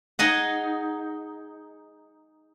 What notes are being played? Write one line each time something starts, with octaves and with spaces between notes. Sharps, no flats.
D#4 G#4 D#5 F#5